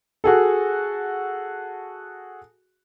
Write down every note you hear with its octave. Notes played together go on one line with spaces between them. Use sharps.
F#4 G#4 A4